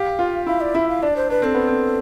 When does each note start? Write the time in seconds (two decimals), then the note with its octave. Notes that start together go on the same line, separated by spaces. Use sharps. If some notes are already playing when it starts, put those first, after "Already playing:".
Already playing: G4 F5
0.19 F4
0.46 E4 F5
0.61 D5
0.75 E4 E5
0.89 F5
1.02 D4 D5
1.16 C5
1.30 D4 B4
1.42 C4 A4
1.55 B3
1.67 C4